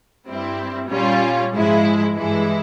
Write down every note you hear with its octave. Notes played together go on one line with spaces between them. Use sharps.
G2 G3 C4 E4
A#2 G3 C#4 F4
G#2 F3 G#3 E4
G2 E3 G#3 E4